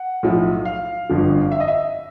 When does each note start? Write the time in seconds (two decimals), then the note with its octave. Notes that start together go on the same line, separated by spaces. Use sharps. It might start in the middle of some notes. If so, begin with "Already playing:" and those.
Already playing: F#5
0.23 B1 A2 F3
0.65 F5
1.10 G1 F2 D3 F3
1.52 E5
1.60 D#5
1.68 E5